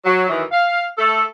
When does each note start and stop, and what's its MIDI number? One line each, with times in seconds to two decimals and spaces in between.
0.05 0.25 54
0.29 0.43 42
0.29 0.43 51
0.29 0.43 52
0.52 0.86 77
0.98 1.23 57
0.98 1.23 69